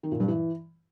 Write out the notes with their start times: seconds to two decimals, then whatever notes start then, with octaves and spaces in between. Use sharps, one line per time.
0.03 D#3
0.12 A#2
0.20 G2
0.28 E3